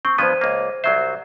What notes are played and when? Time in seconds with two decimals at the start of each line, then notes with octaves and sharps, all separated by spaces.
0.05 C4 C#6
0.18 G2 F3 B3 C5 G#6 D#7
0.41 C#2 A#3
0.84 C2 F#3 C5 E5